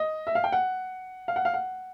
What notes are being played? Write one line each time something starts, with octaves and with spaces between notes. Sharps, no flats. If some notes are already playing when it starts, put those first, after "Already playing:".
Already playing: D#5
E5
F5
G5
F#5
F5
F#5
F5
F#5